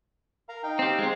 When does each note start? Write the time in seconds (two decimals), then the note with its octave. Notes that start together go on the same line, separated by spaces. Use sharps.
0.49 A#4 F5 A#5
0.63 D#4 F5 G5
0.79 C4 G4
0.99 G#3 C4